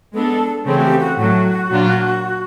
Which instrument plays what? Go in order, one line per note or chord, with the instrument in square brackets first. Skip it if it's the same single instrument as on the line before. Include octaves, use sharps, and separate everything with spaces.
[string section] G#3 B3 D4 [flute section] A4
[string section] C#3 E3 A3 C4 [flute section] G#4
[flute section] F#4
G4
F#4
[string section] A2 F#3 A3 [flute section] F#4
[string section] A#2 F#3 A#3 D4 F4